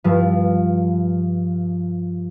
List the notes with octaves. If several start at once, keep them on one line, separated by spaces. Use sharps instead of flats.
G2 F3